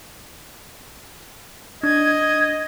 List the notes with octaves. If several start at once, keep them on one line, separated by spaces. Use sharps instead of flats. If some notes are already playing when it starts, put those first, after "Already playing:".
D4 D#5 G#6